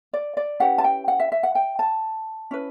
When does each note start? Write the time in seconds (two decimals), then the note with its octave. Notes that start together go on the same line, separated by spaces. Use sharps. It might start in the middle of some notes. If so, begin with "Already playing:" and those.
0.13 D5
0.37 D5
0.60 C#4 E4 G4 B4 F#5
0.78 A5
0.84 G5
1.08 F#5
1.20 E5
1.32 E5
1.43 F#5
1.55 G5
1.79 A5
2.51 C#4 E4 B4